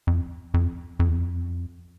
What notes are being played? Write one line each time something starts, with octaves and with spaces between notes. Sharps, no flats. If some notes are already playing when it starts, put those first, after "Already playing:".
F2
F2
F2
E2
F2